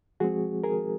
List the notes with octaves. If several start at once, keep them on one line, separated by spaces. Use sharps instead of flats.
F3 G#3 C4 F#4 G#4
G#4 A#4